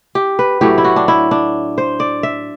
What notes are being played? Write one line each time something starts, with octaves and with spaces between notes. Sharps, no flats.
G4
B4
A2 F#3 A3 G4
E4
F#4
D4
E4
D4
C5
D5
E5